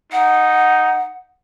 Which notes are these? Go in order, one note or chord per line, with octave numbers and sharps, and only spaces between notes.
D#4 F#5